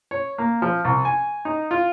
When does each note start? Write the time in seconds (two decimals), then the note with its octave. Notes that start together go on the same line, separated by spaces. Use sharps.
0.11 C#5
0.38 A#3
0.62 F3
0.85 C2
1.05 G#5
1.45 D#4
1.71 F4